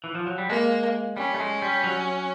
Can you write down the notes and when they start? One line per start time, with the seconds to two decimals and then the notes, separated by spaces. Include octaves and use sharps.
0.04 E3
0.15 F3
0.27 F#3
0.38 G3
0.49 G#3 A#3
1.17 G3 C#4
1.34 A3
1.40 G#3
1.62 G3
1.84 F#3